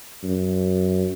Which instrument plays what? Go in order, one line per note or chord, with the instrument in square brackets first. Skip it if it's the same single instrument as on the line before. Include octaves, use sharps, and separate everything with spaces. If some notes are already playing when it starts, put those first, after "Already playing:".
[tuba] F#2